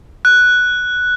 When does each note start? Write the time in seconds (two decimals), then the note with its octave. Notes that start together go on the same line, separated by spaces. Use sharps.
0.25 F#6